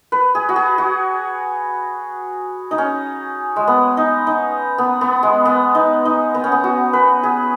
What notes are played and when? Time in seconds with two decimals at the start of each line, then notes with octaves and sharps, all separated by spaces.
0.12 B4
0.35 G#4
0.49 F#4
0.56 G#4
0.78 F#4
2.71 D#4
2.78 C#4
3.56 G#3
3.67 B3
3.97 D#4
4.27 D#4
4.78 B3
5.01 B3
5.23 G#3
5.45 B3
5.75 D#4
6.05 D#4
6.35 B3
6.44 C#4
6.52 B3
6.64 F#4
6.93 B4
7.23 G#4